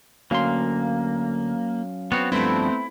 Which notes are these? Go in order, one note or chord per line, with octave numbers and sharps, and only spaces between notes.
D2 F#3 A#3 C#4 F5 C6
B3 C4 F#4 C#5
G2 F3 A3 B3 C4 E4